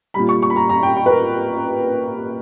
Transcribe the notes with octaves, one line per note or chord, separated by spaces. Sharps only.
A#2 G3 B5
C#6
C#6
B5
A#5
A#5
G5
G5
B4
A#4